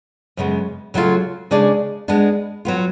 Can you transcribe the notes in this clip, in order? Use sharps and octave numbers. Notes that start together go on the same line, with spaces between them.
F#2 C#3 G#3 B3
C#3 F#3 A3 F4
C#3 G#3 D4 G#4 D5
G#3 B3 D4
F#3 B3 F4